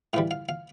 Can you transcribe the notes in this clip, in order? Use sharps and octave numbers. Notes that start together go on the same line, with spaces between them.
A2 E3 G3 F5
F5
F5